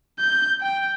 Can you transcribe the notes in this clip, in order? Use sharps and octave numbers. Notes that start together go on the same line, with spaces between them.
G6
G5